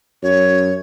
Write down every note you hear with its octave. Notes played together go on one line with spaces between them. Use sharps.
F#2 C#5